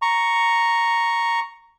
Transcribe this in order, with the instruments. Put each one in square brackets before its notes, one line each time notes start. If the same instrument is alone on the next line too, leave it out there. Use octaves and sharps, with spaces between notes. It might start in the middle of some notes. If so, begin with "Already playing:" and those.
[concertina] A#5 C#6